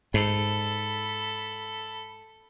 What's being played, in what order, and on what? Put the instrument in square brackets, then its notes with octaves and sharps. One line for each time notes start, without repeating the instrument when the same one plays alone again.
[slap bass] G#2 [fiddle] A4 B5